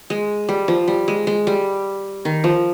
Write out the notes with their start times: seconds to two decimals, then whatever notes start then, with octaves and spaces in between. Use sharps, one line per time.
0.10 G#3
0.49 G3
0.68 F3
0.88 G3
1.08 G#3
1.27 G#3
1.47 G3
2.25 D#3
2.44 F3